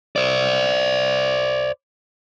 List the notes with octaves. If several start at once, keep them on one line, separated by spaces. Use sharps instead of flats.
C5 D5